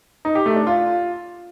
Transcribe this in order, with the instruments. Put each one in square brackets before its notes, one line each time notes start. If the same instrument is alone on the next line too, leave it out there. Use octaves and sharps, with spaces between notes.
[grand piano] D#4
G4
A3
D4
F4